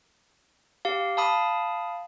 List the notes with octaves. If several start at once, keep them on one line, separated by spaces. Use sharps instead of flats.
G4 F5
F5 A5 B5 D#6